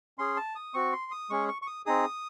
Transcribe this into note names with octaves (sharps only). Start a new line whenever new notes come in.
C#4 G#4 C6
A5
D#6
C4 F#4 C#6
C6
D#6
G#3 C#4 G#4 C#6
C#6
C#6
D#6
C4 D#4 G#4 D#6